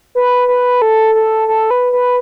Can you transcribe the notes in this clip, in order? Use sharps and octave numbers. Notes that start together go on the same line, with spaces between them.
B4
B4
A4
A4
A4
B4
B4